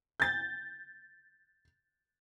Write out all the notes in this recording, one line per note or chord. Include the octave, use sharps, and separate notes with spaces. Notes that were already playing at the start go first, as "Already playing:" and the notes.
G6 A6